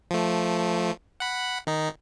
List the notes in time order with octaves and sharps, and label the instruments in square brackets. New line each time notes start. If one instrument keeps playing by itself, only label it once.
[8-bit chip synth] F3 A3
F#5 B5
D#3 D#4